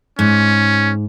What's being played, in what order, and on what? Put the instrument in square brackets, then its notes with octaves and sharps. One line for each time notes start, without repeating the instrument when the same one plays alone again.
[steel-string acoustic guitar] G#2 [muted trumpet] C#4